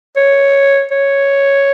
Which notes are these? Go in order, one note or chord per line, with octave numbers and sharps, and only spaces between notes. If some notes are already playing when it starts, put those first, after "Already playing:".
C#5
C#5